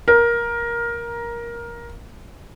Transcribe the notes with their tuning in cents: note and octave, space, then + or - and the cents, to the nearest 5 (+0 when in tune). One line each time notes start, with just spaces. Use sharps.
A#4 +15